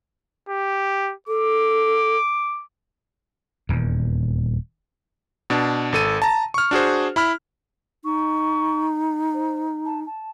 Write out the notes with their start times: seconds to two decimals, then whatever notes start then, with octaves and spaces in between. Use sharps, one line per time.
0.49 G4
1.28 A4 D6
3.69 D#1 E2
5.50 B2 D4
5.93 G#1 A4 D#7
6.22 A5 A#5
6.54 C#6 F6
6.71 D4 F#4 G#4 C5
7.16 E4 B5 F6
8.04 D#4 C#6
9.33 C5
9.85 A5
10.06 A5